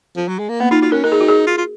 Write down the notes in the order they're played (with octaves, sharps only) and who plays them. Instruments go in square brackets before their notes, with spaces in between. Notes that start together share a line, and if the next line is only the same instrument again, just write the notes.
[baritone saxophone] F3
F#3
G#3
A#3
[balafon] A#3 [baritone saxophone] B3
[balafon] D#4 [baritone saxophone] F4
[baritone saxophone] F4 [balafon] F#4
[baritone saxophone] C#4 [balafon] A#4
[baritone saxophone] D#4 [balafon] A#4
[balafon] G#4
F#4
G#4
[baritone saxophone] F4
F4